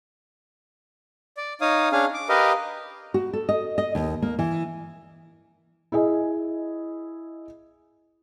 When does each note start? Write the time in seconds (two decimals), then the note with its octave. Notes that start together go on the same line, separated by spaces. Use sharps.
1.37 D5
1.61 D#4 C#5 F5 D#6
1.92 C#4 D4 G#4 F5
2.14 D6
2.29 G4 A#4 B4 D#5 F5
3.14 F#4
3.33 A4
3.49 D#5
3.78 D#5
3.95 D#2
4.22 A#3
4.39 E3
5.92 E4 G#4 D#5 G#5